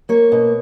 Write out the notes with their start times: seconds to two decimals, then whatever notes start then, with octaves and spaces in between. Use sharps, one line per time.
0.09 A#3 C#5
0.32 B2